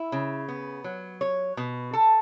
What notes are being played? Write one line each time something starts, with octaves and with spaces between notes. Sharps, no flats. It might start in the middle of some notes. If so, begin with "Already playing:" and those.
Already playing: E4
C#3
B3
F#3
C#5
B2
A4